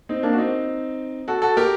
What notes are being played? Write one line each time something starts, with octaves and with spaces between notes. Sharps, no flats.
C4 D#4
A#3 D4
F#4
C4 D#4
F#4 A4
F#4 A4
G4 A#4